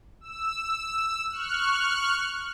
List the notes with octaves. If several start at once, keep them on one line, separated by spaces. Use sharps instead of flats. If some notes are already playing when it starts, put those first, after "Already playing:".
E6
C#6 F6 F#6